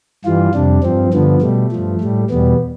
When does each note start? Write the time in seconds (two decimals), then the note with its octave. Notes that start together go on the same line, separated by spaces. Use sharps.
0.25 G2 E3 G3 F4
0.54 F2 C3 G3 D4
0.83 G2 F3 C4
1.13 G2 D3 F3 B3
1.42 B2 G3 A3
1.72 G2 F3
2.01 A2 G3
2.30 E2 B2 G3 B3